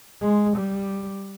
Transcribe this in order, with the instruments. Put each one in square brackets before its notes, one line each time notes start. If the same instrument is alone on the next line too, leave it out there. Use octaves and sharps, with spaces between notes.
[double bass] G#3
G3